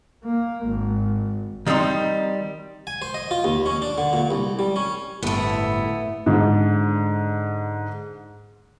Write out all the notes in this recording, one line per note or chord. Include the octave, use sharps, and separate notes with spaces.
A#3
G#1
D#3 G3 C4 D#4 C6
G#5
C5
D#5
F4
D#2
C#4
D4
D3
A#2
C2
G3
C#4
G1 A2 A3 B3 E4 B4
G#2 D3